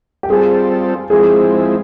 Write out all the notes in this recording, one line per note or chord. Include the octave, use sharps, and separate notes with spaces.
G4
G3 C4 F4 G#4 A4
F3 G#3 C4 E4 G#4